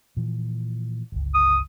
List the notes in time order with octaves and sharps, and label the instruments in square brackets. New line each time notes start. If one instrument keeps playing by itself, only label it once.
[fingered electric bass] A#2 E3 F3
D1 G1 C#2
[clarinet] D#6